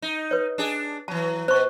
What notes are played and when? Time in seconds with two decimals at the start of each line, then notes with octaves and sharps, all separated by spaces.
0.02 D#4
0.31 B4 C#5
0.58 D4 G#4
1.08 E3 F#3 A5
1.48 B2 C5 C#6